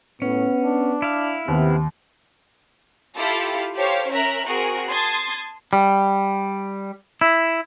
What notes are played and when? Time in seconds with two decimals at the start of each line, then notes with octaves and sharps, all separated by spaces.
0.22 A2 B3 C#4
0.63 D4
1.02 E4 F5
1.48 D#2 C3 B3
3.16 E4 F4 G4 A4 F5
3.75 G4 A4 C5 C#5 F5
4.10 C#4 A#4 E5 A#5 F#6
4.46 C4 F#4 G#4 A#4
4.90 A5 C6 D#6 G#6 A6
5.73 G3
7.21 E4